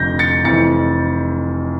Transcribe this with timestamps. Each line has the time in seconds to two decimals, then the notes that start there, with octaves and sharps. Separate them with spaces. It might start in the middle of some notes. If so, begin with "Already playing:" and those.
Already playing: F1 F2 D3 F3 G6 A#6
0.19 A6 C#7
0.44 F1 F2 E3 A6 C#7